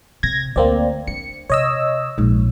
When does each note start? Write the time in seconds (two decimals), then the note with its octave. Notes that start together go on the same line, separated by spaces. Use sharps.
0.23 C3 G#6 A#6
0.56 D2 A#3 C4 D5
1.08 D4 C#7
1.50 C3 C#5 D#5 E6
2.18 A#1 G#2